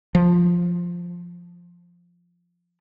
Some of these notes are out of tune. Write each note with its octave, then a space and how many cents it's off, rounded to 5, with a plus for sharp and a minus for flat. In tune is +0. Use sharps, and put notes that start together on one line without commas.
F3 +0